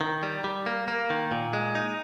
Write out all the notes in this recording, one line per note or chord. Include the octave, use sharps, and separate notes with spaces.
D#3
G3
G3
A#3
A#3
D#3
A#2
G#3
D#4